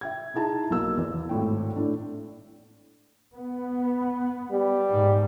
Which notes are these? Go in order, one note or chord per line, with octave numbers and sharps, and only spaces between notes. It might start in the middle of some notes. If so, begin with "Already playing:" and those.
E5 G5 G#6
D#4 E4 G#4 A5 A#5
B1 A#3 E6
E2
G#1 A2 G5
A2 D4
B3
G3
G#2